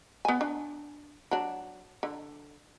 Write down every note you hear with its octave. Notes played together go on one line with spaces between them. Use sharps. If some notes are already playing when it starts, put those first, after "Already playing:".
B3 G#5
D4
F#3 D4
D3